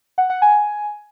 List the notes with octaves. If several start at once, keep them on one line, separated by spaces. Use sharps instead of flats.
F#5
F#5
G#5